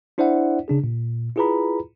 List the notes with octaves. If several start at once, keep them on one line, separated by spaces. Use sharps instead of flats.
D4 E4 C5 D5 E5 F#5
C#3 D4 G#4
A#2
E4 F4 G#4 B4 A#5 B5